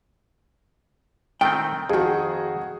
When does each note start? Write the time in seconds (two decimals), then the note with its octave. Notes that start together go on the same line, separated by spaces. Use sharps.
1.41 D#3 A3 C4 G5
1.89 F2 D#3 F#4 G#4